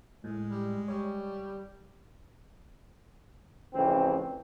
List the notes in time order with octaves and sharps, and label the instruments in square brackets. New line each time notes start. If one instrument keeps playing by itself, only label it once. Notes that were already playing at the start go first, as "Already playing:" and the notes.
[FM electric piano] A2 [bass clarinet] G#3
[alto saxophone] G3
[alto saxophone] G3 [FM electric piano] C#5
[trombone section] A1 F2 C#3 C4